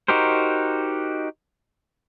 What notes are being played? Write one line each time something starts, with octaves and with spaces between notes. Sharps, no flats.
D#4 F#4 G4 A#4 C5